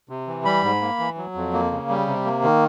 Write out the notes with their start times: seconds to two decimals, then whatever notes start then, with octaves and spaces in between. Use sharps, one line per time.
0.09 C3
0.27 E3
0.45 G3 B5
0.63 G#2
0.81 A#3
0.99 E3
1.17 F#3
1.35 F2
1.53 A#3
1.71 C#3
1.89 G3
2.07 C3
2.25 A#3
2.43 D#3